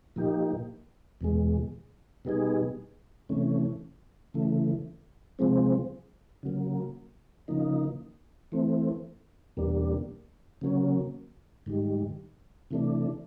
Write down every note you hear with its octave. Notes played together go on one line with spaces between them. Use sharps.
A#2 F3 A#3 D#4 G4
E2 B2 G#3
B2 G3 B3 D#4 G#4
C3 E3 A3 C#4
C#3 E3 A3
C3 F3 G#3 C4
C#3 F#3 A#3
C#3 F3 A#3 D#4
E3 A3 C4
E2 B2 G3 A#3 D4
C#3 F#3 A#3 C#4
G#2 D#3 G3
C3 E3 A3 D4